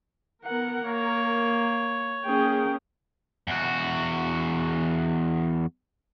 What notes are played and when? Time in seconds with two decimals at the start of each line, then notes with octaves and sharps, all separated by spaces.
0.45 B3 A#4 F#5
0.85 A#3 C#5
2.25 A#3 C#4 G#4 G5
3.47 E2 F#4